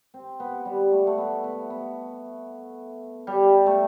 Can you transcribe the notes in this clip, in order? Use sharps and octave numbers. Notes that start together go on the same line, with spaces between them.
C4
B3
G3
A3
A3
B3
B3
B3
G3
A3